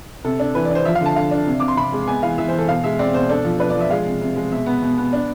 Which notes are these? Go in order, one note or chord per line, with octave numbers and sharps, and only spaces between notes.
C3 A4
D4
E3 B4
D5
D4
C5
F3 E5
F5
D3 A5
D3 F5
D4
C3
C3 D6
C6
C3 B5
G#3
B3 G#5
E3 F5
E3 E5
C5
E3
A4
B2 F5
G#3 E5
C4 D5
B2 C5
D4 A4
F3
D4 B4
D5
F3
E5
G#3 F5
C3
C3
G#3
B2 E5
B3
B2
B3
D4